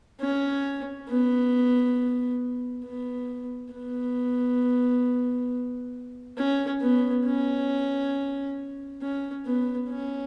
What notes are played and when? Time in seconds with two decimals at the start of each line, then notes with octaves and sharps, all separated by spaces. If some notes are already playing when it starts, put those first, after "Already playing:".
0.20 C#4
1.09 B3
2.85 B3
3.73 B3
6.37 C#4
6.81 B3
7.25 C#4
9.02 C#4
9.46 B3
9.90 C#4